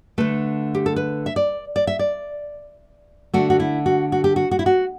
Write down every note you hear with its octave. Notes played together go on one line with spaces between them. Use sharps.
D3 A3 B4
G4
A4
B4
E5
D5
D5
E5
D5
D3 A3 F#4
F#4
E4
F#4
F#4
G4
F#4
F#4
E4
F#4